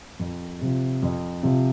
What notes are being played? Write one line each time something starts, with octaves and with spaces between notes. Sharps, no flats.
F2
C3 F3
F2
C3 F3